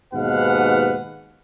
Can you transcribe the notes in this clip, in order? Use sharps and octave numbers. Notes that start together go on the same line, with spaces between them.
D#2 G#2 B2 B4 F5 F#5